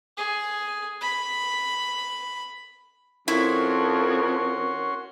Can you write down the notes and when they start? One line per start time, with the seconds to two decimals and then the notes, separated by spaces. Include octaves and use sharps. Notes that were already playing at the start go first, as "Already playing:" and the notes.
0.17 G#4
1.01 B5
3.28 F2 C#4 E4 F#4 A#4 C6